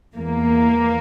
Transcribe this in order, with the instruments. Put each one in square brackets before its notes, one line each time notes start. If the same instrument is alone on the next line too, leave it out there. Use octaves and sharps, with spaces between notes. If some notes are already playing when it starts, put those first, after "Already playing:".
[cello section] E2 E3 A#3